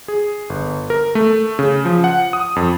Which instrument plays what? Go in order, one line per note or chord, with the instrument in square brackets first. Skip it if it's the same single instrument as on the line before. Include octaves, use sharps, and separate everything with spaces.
[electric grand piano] G#4
G1
A#4
A3
C#3
F3
F#5
D#6
F2